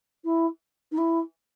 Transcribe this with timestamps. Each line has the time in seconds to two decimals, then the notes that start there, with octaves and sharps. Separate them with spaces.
0.24 E4
0.92 D#4
0.97 E4